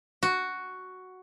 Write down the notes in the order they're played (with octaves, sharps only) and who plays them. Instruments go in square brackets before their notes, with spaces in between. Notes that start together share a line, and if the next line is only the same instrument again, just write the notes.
[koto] F#4